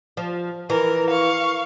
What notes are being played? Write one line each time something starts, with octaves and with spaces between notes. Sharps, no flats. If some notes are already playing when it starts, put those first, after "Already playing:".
F3
E3 A#4
F5 C#6